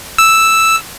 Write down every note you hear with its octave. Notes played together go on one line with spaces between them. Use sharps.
E6